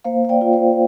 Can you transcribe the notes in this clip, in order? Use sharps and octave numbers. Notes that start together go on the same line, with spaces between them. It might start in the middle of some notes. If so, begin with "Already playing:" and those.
A#3 C5 F5
F5
D5 G5
F4
C5 F5